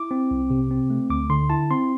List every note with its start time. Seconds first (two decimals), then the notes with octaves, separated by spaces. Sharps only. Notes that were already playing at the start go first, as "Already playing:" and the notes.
Already playing: E4 D6
0.11 C4
0.31 C2
0.50 C3
0.71 C4
0.90 A3
1.10 D2 D6
1.30 D3 C6
1.50 E4 A5
1.71 C4 C6